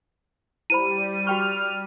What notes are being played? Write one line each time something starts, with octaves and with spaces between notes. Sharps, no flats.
G3 E4 C5 B5 D#7
F#4 G5 C#6 F6